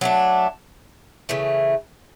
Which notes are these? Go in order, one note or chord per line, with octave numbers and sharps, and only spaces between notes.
F#3 A3 D4
C#3 E3 A3